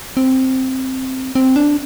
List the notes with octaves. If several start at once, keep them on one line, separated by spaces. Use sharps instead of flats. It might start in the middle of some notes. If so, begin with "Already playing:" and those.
C4
C4
D4